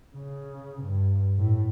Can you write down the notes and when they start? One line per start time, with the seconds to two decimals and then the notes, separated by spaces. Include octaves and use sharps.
0.16 C#3
0.82 G2
1.38 A2